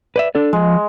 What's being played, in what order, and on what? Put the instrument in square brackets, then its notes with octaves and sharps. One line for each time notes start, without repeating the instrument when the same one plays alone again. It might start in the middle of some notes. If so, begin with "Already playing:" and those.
[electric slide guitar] B4 D5 E5
D4 A4 D5
[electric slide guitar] F3 [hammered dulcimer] G#3